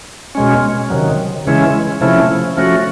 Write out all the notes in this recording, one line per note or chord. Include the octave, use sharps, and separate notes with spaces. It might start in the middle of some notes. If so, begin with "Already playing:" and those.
B2 G#3 C#4
C3 D#3 F#3
C#3 E3 G#3 C#4 E4
C3 F3 A3 C#4 E4
F3 A3 C#4 F#4